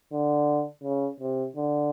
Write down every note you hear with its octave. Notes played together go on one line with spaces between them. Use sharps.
D3
C#3
C3
D3